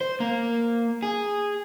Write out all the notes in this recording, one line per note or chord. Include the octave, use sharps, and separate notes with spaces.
C5
A#3
G#4